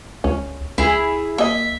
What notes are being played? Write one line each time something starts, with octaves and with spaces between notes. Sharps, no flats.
C#2 C#4
C#2 E4 G#4
A#3 D#5 E5